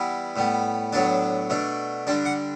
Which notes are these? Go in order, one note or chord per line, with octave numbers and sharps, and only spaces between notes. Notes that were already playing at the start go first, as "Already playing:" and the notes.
Already playing: E3 G3 B3 E4
A2 G3 B3
A2 F#3 B3 D4 A5
B2 A3 D4
D3 G3 D4 A5
F#5